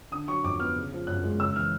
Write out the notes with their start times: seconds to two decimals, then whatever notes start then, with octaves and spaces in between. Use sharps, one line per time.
0.11 D3 D#6
0.28 F#3 C#6
0.44 F2 D6
0.60 B3 F6
0.76 C#3
0.92 F3
1.07 F#2 F#6
1.24 G#3
1.40 C#3 E6
1.55 E3 F6